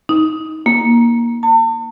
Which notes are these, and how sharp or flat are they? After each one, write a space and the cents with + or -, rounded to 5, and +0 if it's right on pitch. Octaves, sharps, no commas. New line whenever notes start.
D#4 +20
A#3 +20
A5 +40